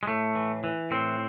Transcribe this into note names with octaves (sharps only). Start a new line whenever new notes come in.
G#3
A2 A3
E3
E3
A2 C4